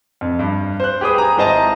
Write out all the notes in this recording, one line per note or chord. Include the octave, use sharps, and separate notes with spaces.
F2
G2
C5 F#6
G4 G#4 B4 D#6
G#5 A#5
G#1 E4 C5 D#5 A5 A#5